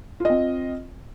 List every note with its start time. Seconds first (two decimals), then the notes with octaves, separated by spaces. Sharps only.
0.20 F4
0.25 D#5
0.30 C4